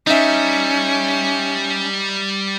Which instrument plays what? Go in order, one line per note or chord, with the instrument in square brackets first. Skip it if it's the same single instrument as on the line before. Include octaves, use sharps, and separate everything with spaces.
[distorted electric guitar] G3 [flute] C#4 [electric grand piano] D#4 E5